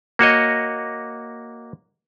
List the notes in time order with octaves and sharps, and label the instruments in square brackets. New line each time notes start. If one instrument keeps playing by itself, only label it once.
[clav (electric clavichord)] A#3 F#4 C#5 D#5